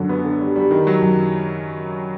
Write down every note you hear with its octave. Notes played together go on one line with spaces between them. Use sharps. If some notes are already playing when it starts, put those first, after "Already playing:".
Already playing: F#2 D3
B3
D3
G3
G3
D#3
F#3
F#2